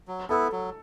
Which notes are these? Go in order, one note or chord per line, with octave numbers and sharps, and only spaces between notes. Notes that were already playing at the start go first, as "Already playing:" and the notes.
F#3
B3 E4 A4
F#3